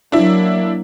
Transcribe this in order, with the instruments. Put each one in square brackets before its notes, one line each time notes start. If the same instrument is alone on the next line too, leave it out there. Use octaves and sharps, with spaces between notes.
[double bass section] F#3 A#3 [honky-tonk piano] D4 E4